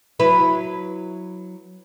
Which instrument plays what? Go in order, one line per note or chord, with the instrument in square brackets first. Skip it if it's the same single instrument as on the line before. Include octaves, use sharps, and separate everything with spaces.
[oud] F#3 E4 B4